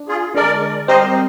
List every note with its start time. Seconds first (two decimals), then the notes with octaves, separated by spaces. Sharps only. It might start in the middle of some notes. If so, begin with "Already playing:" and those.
Already playing: D4
0.08 F4 G#4
0.35 D3 G#3 D4 A#4 D5
0.88 G3 C4 G4 A#4 C5 D#5